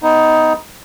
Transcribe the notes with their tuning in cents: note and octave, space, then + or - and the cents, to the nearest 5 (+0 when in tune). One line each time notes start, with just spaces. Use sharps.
B3 +15 D#4 +10